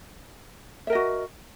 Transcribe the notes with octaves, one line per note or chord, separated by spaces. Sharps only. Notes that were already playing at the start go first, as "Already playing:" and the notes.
F#4 A#4 D#5 E5